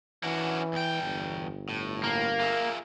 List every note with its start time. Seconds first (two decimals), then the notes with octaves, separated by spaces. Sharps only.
0.23 E3 C#4 D4 F#4
0.73 E2 G5
1.03 G1
1.69 A2
2.04 A#3
2.40 F4 G#4 E5